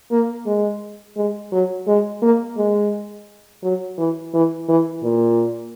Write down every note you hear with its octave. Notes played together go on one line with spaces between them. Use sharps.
A#3
G#3
G#3
F#3
G#3
A#3
G#3
F#3
E3
E3
E3
A#2